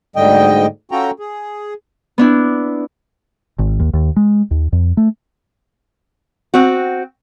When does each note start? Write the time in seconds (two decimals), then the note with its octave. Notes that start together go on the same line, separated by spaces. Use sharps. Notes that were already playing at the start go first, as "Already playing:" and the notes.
0.16 D2 G#2 D3 G3 D#5 G5
0.91 C#4 F4 F#4 A4 G5 A#5
1.19 G#4
2.18 B3 D4 E4
3.59 G#1
3.80 D#2
3.93 D#2
4.16 G#3
4.51 D#2
4.72 F2
4.97 A3
6.54 C4 F#4